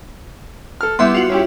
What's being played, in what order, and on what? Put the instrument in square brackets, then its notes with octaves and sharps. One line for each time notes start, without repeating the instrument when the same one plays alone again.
[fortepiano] A4 F6
[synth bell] G3 E5 C6 [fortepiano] B3 E4
[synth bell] F4 F#4
[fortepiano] C#4 E4 G4